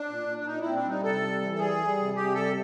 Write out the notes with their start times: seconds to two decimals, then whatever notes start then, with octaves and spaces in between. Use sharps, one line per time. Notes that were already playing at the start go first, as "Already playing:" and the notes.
Already playing: D4
0.09 A#2
0.28 A#2
0.39 D4
0.46 A#2 D#4
0.61 C4 E4
0.75 D4
0.85 G3 D#4
1.03 C3 A4
1.22 G3
1.41 E3
1.54 A4
1.59 G3 G#4
1.78 G3
1.98 C3
2.16 C3 G4
2.34 G3 A4